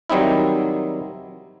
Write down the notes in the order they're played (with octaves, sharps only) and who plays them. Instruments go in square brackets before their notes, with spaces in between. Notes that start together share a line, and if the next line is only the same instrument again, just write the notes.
[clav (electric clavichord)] D#3 F#3 G3 C4 D#4 E4